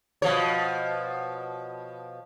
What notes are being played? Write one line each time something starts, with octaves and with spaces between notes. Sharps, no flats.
B2 F3 C#5